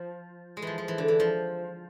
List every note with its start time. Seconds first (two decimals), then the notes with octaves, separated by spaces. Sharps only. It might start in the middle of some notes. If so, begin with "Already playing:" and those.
Already playing: F3
0.57 G#3
0.62 E3 F3
0.78 F3
0.88 E3
0.98 D3
1.08 E3
1.20 F3